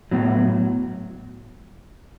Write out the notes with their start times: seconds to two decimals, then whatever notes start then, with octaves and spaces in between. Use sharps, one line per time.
0.11 A2 F#3 B3